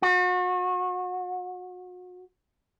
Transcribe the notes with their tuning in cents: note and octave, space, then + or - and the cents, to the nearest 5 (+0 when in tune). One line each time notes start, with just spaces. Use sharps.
F#4 -35